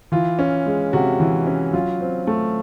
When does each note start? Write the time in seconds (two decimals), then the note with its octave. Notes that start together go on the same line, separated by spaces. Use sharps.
0.12 E3 F4
0.39 C#4
0.67 G#3
0.93 C3 F#4
1.20 E3
1.47 C#4
1.73 F#3 F4
2.01 C4
2.27 A3